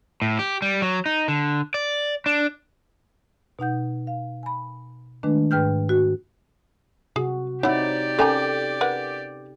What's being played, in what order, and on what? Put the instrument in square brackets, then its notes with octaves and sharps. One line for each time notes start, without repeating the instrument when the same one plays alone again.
[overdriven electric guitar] A2
G4
G3
F#3
D#4
D3
D5
D4
[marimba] B2 D#4 F#5 G6
F5
G#5 B5
D#3 G#3 A3 D4 B4
G#2 B4 G5 F6 G6
F#4
[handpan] C3 F#4 [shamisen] G#4
[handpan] C4 D#4 [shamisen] E4 F#5 [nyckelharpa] G4 D5 [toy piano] C#5
[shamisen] D#3 G#5 A#5 [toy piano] C#4 A4
[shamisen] A#4 B4 F#5